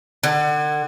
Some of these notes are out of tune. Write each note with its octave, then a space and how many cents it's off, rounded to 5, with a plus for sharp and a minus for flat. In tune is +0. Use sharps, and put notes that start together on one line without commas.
D3 +35